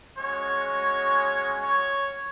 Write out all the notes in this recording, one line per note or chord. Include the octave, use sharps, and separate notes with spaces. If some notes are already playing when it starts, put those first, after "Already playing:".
G#3 C#4 F#4 C#5
C#5